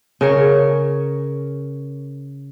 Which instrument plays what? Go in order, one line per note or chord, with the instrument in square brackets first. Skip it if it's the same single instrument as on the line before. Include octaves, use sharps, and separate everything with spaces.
[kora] C#3 A#4 C#5